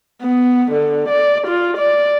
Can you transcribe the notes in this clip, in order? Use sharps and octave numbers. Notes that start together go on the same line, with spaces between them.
B3
D3
D5
F4
D5